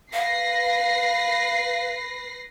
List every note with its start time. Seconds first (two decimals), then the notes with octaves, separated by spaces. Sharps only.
0.13 B4 F5 A#6 C7